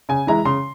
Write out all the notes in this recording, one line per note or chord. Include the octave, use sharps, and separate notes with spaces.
C#3 G#5
E3 G#3 E4 A#5
C#3 C6